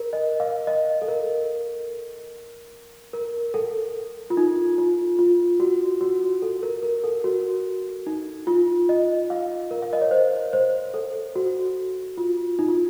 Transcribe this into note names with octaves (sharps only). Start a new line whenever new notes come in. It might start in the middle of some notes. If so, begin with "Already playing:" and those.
Already playing: A#4
D#5
F5
D#5
A4
A#4
A#4
A4
F4
D#4
F4
F4
F#4
F#4
A4
A#4
A#4
A4
F#4
D#4
F4
D#5
F5
A#4
F5
D#5
C#5
C5
C5
A4
F#4
F4
D#4
F4